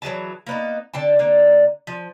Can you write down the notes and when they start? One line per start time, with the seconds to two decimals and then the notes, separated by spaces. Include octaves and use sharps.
0.02 E3 F#3 G#4 A5
0.46 A#3 B3 D#4
0.94 D3 G5 A5
1.19 D3 A#3
1.87 F3